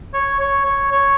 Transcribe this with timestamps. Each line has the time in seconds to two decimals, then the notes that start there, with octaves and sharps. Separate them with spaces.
0.14 C#5
0.40 C#5
0.65 C#5
0.92 C#5